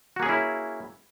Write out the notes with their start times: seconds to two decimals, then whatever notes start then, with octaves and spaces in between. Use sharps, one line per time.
0.16 F#4
0.19 A#3
0.23 G#4
0.26 C#4
0.29 E4